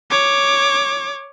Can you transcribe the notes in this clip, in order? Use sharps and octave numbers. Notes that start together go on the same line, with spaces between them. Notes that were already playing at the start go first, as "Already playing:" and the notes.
C#5 D6